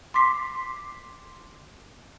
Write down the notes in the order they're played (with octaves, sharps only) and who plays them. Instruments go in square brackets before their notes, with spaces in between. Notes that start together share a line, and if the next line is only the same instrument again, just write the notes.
[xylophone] C6 D6 B6 C7